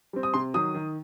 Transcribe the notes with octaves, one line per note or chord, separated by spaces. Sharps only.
G3 C4
D#6
C3 C6
D#3 F#3 D#6
D#3